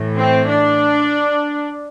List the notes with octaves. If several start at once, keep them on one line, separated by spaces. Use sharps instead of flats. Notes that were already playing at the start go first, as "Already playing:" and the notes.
Already playing: A2 E3
C4
D4